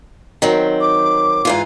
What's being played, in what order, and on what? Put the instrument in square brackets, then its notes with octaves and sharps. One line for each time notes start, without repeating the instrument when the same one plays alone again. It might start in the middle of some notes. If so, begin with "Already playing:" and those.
[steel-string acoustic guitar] D#3 F#3 C4
[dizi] D6
[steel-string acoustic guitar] G#2 E3 F4